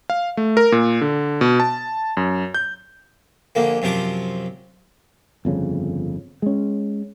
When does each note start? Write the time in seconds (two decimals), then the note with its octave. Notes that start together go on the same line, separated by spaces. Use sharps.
0.10 F5
0.37 A3
0.57 A#4
0.72 A#2
1.01 D3
1.41 B2
1.60 A5
2.17 F#2
2.54 G6
3.55 A#1 D3 A#3
3.82 F#2 C3 F3 C5 D6
5.45 G1 F2 C#3
6.42 G#3 C#4